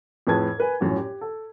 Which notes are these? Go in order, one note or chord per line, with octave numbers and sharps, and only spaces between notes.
F2 A2 G#4 B4 A5 G#6
A#4 B4 G#5
A#1 F#2 A2
G4
A4